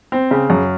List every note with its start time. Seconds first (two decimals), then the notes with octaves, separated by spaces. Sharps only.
0.12 C4
0.31 C#3
0.50 F#2